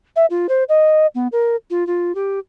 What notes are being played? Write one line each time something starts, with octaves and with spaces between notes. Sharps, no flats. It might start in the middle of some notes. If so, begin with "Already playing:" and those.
E5
F4
C5
D#5
B3
A#4
F4
F4
G4